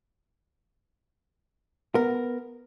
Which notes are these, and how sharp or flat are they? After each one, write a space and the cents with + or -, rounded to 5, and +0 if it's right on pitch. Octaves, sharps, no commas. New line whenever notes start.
B3 +0 A#4 -5